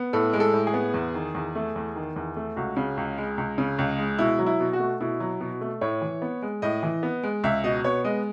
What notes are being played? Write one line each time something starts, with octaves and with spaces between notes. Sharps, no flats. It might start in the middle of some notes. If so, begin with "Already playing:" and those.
Already playing: B3
A2 A4
G#3
A4
A2
G#4
B3
E2
D#3
E2
A3
E2
D#3
E2
A3
C#2 F#4
C#3
C#2
G#3
C#2
C#3
C#2
G#3
B2 E4
F#3
E4
B2
F#4
A3
B2 E4
F#3
B2
A3
A2 C#5
E3
B3
G#3
A2 D#5
E3
B3
G#3
C#2 E5
B2 D#5
B3 C#5
G#3 D#5